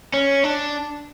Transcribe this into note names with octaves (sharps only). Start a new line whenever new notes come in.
C#4
D4